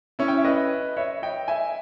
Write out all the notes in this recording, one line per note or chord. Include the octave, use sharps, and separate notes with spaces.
C#4 E4
G5
E5
B4 D#5
C#5 E5
D#5 G5
E5 G#5